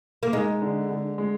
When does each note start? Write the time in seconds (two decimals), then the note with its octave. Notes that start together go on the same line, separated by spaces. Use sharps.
0.23 A#3
0.33 G#3 D#4
0.62 D3
0.91 D3
1.18 G#3